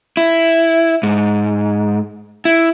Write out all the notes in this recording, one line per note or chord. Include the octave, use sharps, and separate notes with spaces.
E4
G#2
E4